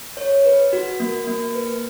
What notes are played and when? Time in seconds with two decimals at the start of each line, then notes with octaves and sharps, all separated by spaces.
0.17 C#5
0.46 B4
0.73 F#4
1.00 A#3
1.27 A#3
1.55 B4